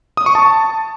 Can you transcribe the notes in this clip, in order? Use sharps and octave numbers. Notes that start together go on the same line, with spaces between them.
D#6
C#6
A5